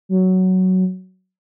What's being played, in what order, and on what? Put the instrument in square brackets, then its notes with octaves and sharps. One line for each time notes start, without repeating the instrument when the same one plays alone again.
[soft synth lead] F#3